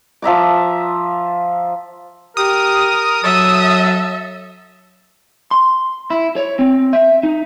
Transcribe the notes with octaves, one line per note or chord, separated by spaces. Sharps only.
F3 E5 A#5 D6
G4 A#4 D#6
F#3 A4 E5
C6
E4
C#5
C4
E5
D#4